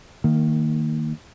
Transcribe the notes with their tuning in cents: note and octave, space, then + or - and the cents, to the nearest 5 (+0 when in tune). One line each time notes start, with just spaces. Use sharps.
D#3 +0 A#3 -20